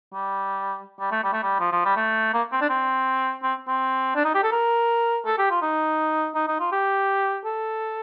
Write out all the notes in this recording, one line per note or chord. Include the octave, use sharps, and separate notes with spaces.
G3
G3
A3
G3
A3
G3
F3
F3
G3
A3
A#3
C4
D4
C4
C4
C4
D4
D#4
G4
A4
A#4
A4
G4
F4
D#4
D#4
D#4
F4
G4
A4